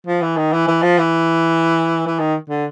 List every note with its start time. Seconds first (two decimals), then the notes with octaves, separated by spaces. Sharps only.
0.07 F3
0.22 E3
0.37 D#3
0.53 E3
0.68 E3
0.82 F3
0.98 E3
2.07 E3
2.19 D#3
2.49 D3